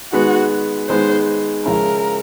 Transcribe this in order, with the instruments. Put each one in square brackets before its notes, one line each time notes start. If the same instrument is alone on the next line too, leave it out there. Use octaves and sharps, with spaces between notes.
[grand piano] D#3 G#3 B3 [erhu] F#4
[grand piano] D#3 G#3 B3 [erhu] C5
[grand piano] C#3 F3 G#3 C#4 E4 [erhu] A#4